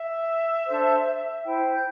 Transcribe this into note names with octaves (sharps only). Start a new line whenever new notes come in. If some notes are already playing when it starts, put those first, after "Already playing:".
Already playing: E5
D4 A4 C5
E4 C5 G5
G6